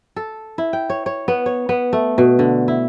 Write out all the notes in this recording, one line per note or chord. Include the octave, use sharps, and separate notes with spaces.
A4
E4
G5
C#5
C#5
B3
C#5
B3
A3
B2
D3
E4